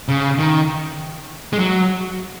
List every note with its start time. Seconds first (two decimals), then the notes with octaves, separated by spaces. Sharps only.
0.08 C#3
0.38 D#3
1.53 G#3
1.59 F#3